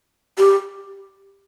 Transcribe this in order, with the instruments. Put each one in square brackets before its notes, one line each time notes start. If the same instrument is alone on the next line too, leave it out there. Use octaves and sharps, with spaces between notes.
[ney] G4